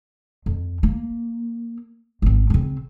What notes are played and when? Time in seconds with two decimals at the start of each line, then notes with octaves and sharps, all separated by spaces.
0.46 F2
0.83 A#3
2.22 G#1 C4
2.50 C#3 C4